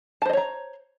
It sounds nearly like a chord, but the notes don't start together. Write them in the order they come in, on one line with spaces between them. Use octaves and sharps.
A5 C5 D#5 C#5 A#5